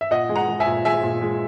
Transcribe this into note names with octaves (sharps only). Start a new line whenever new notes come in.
E5
A#2 D#5 F#5
G#3
F#5 A#5
G#3
E5 G#5
A#2
G#3 E5 G#5
A#2
G#3